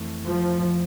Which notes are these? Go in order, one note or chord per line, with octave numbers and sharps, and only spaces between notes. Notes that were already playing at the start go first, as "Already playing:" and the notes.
Already playing: F2 E3 A3 C4
F3